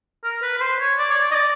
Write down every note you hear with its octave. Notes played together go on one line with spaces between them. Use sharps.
A#4
B4
B4
C5
C#5
D5
C#5
D5
D#5
D5